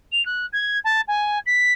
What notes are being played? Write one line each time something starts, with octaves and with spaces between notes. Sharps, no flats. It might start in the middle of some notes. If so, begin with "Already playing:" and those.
F7
F#6
G#6
A5
G#5
B6